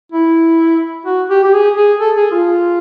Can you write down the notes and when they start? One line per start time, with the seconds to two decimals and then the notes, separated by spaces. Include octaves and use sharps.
0.12 E4
1.06 F#4
1.30 G4
1.44 G4
1.53 G#4
1.77 G#4
2.00 A4
2.17 G#4
2.32 F4